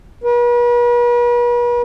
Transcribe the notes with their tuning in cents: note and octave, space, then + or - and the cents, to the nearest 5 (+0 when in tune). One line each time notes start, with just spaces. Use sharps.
B4 -45